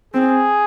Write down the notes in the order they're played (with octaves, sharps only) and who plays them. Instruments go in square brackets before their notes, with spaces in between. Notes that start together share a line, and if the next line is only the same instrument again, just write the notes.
[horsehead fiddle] C4 [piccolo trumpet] G#4